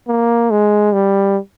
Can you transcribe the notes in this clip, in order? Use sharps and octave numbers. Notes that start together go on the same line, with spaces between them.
A#3
G#3
G3